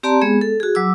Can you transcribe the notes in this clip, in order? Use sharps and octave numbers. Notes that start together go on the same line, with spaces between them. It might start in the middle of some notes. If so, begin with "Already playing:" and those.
C4 G4 D5 A5 A#5 C6
G#3 B3 G#4
A4
F#4 G#4
F#3 D6 E6